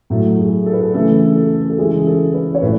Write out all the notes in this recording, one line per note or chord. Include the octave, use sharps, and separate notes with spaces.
A2 F#3 A3
G#4
A4
B4
A4
C#3 E3 A3 A4
A4
A4
C#3 E3 G#3 G#4
A4
B4
C#5
A2 E3 A3 B4